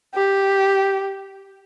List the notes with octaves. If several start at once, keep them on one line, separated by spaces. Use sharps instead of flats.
G4